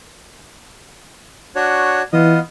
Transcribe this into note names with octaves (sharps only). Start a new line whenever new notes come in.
D4 F#4 C#5
E3 B3 F4 D#5